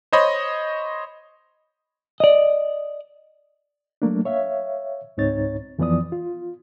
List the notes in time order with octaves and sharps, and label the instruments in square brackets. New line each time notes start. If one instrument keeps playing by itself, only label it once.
[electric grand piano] C5 C#5 D#5 B5
[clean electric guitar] D5 D#5
[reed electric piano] F#3 A3 A#3 D4
C#5 E5 F5
C#2 G#2 C4 D#4 C#5 A6
F2 E3 F3 B3 D5 D#6
F4